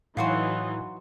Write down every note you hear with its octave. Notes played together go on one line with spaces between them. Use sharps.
A2 E3 F#3 D#4 F4 F#4 C5